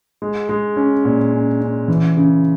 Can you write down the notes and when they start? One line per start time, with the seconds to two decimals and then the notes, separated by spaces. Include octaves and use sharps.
0.22 G#3
0.49 G#3
0.76 C#4
1.05 A#2
1.33 C#4
1.61 C#4
1.88 E3
2.17 C#3